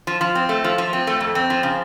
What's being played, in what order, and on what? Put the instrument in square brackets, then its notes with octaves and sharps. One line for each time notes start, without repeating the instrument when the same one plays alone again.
[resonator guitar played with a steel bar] F3
F3
C4
A3
F3
F3
C4
A3
F2
C4
F3
C#3